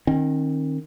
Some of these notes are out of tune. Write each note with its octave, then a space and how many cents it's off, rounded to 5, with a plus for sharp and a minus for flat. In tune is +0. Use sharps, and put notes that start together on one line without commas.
D#3 -10 C4 +45